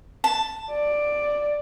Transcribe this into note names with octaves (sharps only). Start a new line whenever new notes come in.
A5
D5